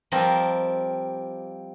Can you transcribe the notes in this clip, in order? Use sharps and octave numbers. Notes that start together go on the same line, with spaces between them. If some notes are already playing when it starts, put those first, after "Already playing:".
F3 G3 C4 A#4 D#5 C6